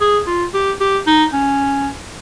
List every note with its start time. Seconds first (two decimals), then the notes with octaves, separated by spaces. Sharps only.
0.01 G#4
0.27 F4
0.54 G4
0.81 G4
1.07 D#4
1.33 C#4